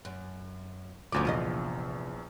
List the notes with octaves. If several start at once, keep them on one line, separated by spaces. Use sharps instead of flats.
F#2
G1 D2 F3 F#3 C#4 D6
A#1 E2 C3 F4 D#5